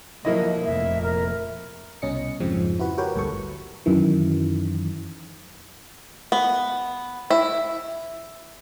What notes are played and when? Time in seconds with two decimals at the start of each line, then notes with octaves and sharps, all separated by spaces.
0.25 D3 F3 F#3 A#3 E4 D#5
0.65 F1 F2 A#2 E5
1.03 A#4
2.02 C2 B2 C#4 D#5 C#7
2.40 F2 G#2 C#3 F3 C4
2.79 E4 F#4 B4
2.98 F#4 G4 A#4 B4 C#5 G5
3.14 G#1 D2 G2 A#2 A4 C#6
3.86 F#2 D#3 E3
6.32 B3
7.31 E4